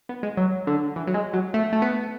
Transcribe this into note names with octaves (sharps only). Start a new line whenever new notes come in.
B3
G#3
F#3
D3
E3
F#3
G#3
F#3
A3
A3
B3